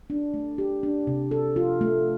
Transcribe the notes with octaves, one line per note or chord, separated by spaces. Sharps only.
D4
A3
G4
D4
C3
A4
F4
A3